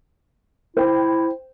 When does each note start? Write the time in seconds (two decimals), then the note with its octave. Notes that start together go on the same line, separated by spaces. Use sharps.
0.77 E4 C5 G5